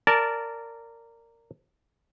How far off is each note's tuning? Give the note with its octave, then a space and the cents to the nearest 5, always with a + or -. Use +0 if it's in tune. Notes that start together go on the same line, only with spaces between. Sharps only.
A#4 -15 D5 -15 A5 +0